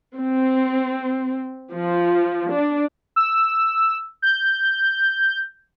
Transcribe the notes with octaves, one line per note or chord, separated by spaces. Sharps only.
C4
F3
D4
E6
G6